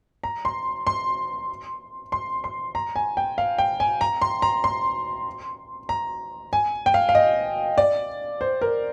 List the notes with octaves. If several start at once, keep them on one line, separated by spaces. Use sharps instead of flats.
A#5
C6
C6
C6
C6
A#5
G#5
G5
F5
G5
G#5
A#5
C6
A#5
C6
A#5
G#5
G5
F5
F5
D#5
D5
C5
A#4